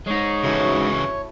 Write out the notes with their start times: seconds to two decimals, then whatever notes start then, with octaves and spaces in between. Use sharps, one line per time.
0.07 G#3 D#4 C#5
0.44 C#3 E3 F#3 A3 F#4
0.69 E4